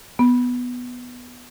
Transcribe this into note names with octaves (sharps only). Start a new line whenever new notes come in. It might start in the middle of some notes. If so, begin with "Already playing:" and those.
B3